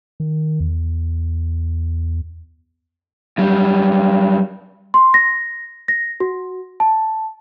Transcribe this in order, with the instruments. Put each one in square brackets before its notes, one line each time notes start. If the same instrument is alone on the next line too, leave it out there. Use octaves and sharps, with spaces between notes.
[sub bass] D#3
E2
[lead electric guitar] F#2 G3
[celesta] C6
A#6
A#6
F#4
A5